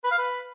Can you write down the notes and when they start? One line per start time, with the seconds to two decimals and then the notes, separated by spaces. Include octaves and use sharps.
0.04 B4
0.11 F5
0.18 B4